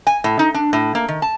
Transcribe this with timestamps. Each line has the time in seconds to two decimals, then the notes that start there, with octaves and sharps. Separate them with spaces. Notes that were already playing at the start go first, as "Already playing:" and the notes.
0.07 G#5
0.24 A2
0.39 D#4
0.54 D4
0.73 A2
0.95 A#3
1.08 D#3
1.22 A5